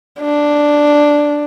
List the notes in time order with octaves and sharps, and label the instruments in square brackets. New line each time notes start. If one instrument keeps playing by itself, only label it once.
[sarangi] D4